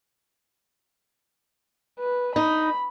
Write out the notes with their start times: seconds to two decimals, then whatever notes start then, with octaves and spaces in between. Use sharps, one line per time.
2.00 B4
2.36 D#4 B5